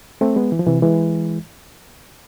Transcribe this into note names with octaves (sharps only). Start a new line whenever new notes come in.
A3 C4
G#3 B3
E3
F3
C3 E3
E3 G#3